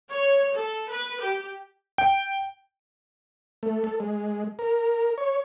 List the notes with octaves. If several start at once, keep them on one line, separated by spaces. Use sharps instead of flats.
C#5
A4
B4
G4
G5
A3
A4
G#3
A#4
C#5